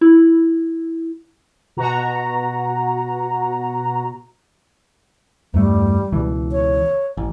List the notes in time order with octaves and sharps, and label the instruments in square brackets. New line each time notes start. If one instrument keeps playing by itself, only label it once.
[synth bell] E4
[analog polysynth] B2 F#4 A#5
[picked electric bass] E2 G2 A3 [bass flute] G3
[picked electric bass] C#2 B2 E3
[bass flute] C#5
[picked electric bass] A1